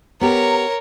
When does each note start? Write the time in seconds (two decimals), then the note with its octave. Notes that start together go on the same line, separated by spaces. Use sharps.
0.21 B3 G4 A#4 C#5 A#5